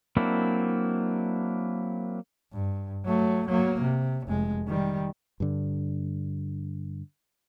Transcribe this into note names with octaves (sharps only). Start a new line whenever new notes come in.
F#3 A#3 C4 D4 E4
G2
F#3 A3
F#3 A#3
C3
F1 G#3
D#3 G3
G2 D3